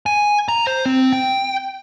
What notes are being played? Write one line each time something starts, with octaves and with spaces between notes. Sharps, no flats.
G#5
A#5
C5
C4
G5